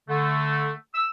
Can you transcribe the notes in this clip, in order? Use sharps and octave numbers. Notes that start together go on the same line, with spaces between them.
D3 A3
E6